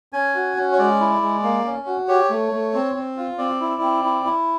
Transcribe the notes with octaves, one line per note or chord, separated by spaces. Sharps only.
C#4 G#5
F#4
C#4
C#5
G#3 D5
E4
G#3
A#3
C#4
F#4
G4 C#5
A3
A3
C4
C4
F4
C4 D5
E4
C4
E4
E4